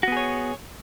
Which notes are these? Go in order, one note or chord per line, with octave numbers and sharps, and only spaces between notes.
B3 F#4 G#4 C#5